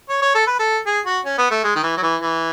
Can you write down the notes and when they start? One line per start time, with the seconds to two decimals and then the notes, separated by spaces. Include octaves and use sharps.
0.09 C#5
0.22 C#5
0.35 A4
0.47 B4
0.59 A4
0.86 G#4
1.05 F#4
1.25 C#4
1.38 B3
1.51 A3
1.64 G#3
1.75 D#3
1.83 E3
1.97 F#3
2.02 E3
2.21 E3